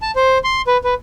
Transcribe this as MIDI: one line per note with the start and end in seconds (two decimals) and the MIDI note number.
0.02 0.11 81
0.16 0.38 72
0.44 0.62 84
0.67 0.77 71
0.84 0.94 71